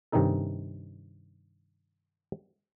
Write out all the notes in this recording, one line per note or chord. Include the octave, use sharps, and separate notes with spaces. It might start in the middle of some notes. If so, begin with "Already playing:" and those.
G2 C3 D#3 C#4 D#4 A4